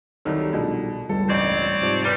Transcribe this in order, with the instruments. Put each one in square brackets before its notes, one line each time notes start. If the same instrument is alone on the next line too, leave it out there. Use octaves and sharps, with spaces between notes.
[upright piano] C2 D#3 F#3 [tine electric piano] G3 D#4 A4
[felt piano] A#1 [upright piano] B2
[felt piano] G1 [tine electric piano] C#2 G2 [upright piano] A4
[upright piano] A1 [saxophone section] C4 C#5 D5
[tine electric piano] G#2 C3 F3
[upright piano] F1 B4 A6 [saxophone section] A#2 G3